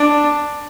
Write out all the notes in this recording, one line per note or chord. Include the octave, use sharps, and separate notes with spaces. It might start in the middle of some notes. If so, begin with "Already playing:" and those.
Already playing: D4